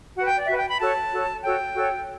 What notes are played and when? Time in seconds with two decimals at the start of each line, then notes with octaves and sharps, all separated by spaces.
0.16 F#4 B4 F#5
0.26 G5
0.37 D5
0.47 F#4 B4 E5
0.58 G5
0.68 B5
0.79 F#4 A4 C#5 A5
1.11 F#4 A4 C#5
1.43 F#4 A4 C#5 G5
1.74 F#4 A4 C#5